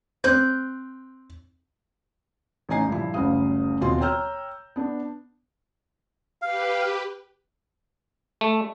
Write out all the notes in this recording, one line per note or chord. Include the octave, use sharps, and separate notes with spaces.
C4 F#6 G6
A1 C#4 D#4 G#5 C7
G2 A#2 F3 E4
F#1 D2 C#3 G3 F5 D#6
D#1 B2 C4 F4 C6
C#5 G5 A#5 E6 F6 G6
B3 D4
G4 B4 F5
A3